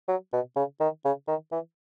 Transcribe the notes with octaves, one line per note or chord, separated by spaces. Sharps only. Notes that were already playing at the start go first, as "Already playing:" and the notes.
F#3
B2
C#3
D#3
C#3
D#3
E3